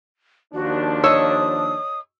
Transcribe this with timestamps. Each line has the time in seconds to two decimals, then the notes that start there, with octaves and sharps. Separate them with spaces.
0.54 D#2 F3 D4 F#4
1.04 C#5 D#5 D#6 E6